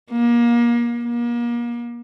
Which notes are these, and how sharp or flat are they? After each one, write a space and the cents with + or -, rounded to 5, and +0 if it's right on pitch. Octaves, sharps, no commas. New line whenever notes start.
A#3 +30
A#3 +35